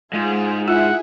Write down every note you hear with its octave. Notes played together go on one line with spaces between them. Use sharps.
G#2 F4 G#4
E4 F4 G#4 E5 F#5